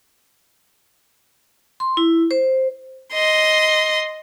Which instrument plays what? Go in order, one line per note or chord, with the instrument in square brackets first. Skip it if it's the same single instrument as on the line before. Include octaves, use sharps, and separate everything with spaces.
[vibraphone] C6
E4
C5
[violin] D#5 C6